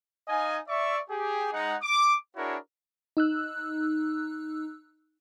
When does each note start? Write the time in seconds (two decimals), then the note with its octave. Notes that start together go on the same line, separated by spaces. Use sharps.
0.28 D#4 D#5 F5 G#5
0.68 D5 E5 C#6
1.10 G4 G#4
1.53 G#3 D#4 F#5
1.82 D6
2.37 D4 E4 F#4 G#4 A#4 C#5
3.17 D#4 E6 F#6